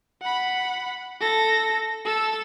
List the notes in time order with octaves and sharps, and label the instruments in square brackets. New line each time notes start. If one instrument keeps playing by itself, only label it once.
[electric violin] F#5 B5
A4 A#6
A4 E6